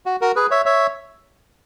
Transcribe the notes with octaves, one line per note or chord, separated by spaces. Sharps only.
F#4
F#4 A#4
G#4 B4
C#5 E5
C#5 E5